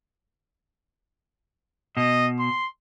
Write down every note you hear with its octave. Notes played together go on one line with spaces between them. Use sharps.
B2 D#5
C6